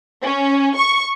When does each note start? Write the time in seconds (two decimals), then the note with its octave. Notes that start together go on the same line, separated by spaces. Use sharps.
0.23 C#4
0.76 C#6